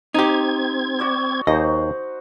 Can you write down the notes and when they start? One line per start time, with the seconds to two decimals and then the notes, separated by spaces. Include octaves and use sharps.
0.14 C4 D#4 G4 G#6
0.99 F#4 D5 E6
1.47 D#2 D#4 F#4 C5 D#5